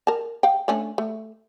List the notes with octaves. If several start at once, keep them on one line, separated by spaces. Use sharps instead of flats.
A#4 A5
F5 G5
A3 C#4 D4
A3